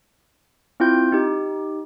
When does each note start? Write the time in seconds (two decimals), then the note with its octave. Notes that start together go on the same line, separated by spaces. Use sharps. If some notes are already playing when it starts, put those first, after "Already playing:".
0.80 C4 E4 F4 G5 G6
1.12 D#4 G4